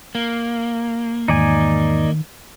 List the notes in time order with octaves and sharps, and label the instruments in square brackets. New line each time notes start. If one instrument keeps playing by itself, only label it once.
[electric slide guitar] A#3
[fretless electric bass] E2 G#2 [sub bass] D#3 [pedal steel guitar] D#4 D5 G#5